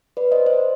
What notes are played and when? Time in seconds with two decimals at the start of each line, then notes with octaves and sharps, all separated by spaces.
0.17 B4 D5
0.32 C5 D#5
0.46 C5 D#5